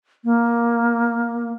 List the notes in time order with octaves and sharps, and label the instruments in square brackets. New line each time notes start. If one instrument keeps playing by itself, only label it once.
[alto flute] A#3